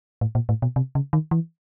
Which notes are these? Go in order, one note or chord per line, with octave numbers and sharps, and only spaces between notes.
A2
A#2
A2
B2
C3
C#3
D#3
E3